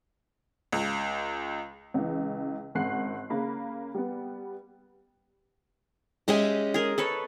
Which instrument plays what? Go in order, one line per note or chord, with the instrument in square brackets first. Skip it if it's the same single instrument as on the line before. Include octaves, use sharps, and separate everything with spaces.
[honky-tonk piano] C#2
C#2 E3
G#1 C#3 F#5 F#6 C7
C#3 A#3 B5
G3 B3
[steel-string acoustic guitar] G#3 C#4 G4 [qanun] D#5 E5 G#5
[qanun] G#4 A#4
A4 B4 C#5